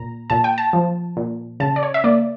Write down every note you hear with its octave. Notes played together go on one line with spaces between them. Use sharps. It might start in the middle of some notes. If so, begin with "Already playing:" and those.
Already playing: A#2 A#5
A#2 A5
G5
A5
F3
A#2
C#3 A5
D5
C#5
E5
A#3 D5